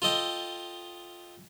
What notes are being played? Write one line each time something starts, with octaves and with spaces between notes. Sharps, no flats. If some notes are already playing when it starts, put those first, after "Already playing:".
F4 A4 D#5 G5